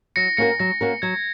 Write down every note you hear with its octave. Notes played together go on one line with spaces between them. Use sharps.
F#3 A#6 C#7
A#3 C#4 F#4 A#4 A#6 C#7
F#3 A#6
A#3 C#4 F#4 A#4
F#3 G#6